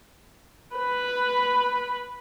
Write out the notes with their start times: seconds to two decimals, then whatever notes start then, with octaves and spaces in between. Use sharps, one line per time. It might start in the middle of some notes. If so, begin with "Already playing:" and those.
0.76 B4 B5